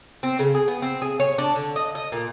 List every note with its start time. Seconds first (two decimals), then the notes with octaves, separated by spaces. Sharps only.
0.23 C4
0.39 C#3
0.55 G#4
0.68 B3
0.82 C4
1.02 G#4
1.20 C#5
1.38 D4
1.56 D3
1.76 D#5
1.95 D#5
2.12 A#2